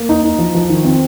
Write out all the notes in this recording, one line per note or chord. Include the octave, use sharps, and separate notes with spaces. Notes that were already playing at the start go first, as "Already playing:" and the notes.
Already playing: A#3
D#4
D#4
F3
F3
D#3
C4